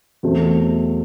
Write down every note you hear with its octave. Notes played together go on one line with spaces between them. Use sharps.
E2 B2 F#3 A3 C4